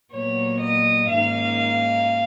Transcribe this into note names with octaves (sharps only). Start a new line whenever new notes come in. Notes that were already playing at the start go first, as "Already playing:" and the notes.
A#2 F#3 B3 C#5
D#5
G#2 D#3 A#3 C#4 F5